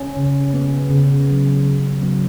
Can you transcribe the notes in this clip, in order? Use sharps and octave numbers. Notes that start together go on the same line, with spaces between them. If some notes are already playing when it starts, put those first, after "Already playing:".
Already playing: C#4
C#3
B3
C#3
F#3 B3
C#3
F#3 B3